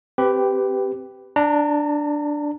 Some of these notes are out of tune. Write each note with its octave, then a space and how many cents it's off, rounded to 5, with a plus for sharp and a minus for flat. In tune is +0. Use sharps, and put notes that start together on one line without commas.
C4 +0 G4 -5 B4 +15
D4 +0 A#5 -35